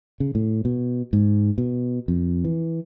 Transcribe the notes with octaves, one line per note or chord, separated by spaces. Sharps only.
C#3
A2
B2
G#2
B2
F2
E3